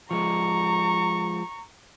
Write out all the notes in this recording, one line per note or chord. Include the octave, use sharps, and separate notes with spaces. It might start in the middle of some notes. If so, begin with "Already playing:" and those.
F3 G#3 A#5 C#6